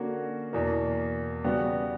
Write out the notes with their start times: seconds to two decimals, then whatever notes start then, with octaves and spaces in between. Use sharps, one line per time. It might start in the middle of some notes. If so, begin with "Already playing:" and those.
Already playing: D3 A#3 C#4 F#4
0.53 E2 B2 A#3
1.44 C#3 G3 B3 F#4